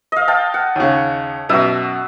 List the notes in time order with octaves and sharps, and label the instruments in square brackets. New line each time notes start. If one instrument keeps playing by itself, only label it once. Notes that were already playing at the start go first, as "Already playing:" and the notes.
[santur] D#5 F5
F5 G5 A5
F#5
[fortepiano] D#2 C#3
[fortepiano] F#2 B2 [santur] F#4 E5